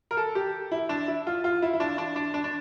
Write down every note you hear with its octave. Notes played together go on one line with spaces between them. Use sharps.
A#4
A4
G4
E4
D4
E4
F4
F4
E4
E4
D4
D4
D4
D4
D4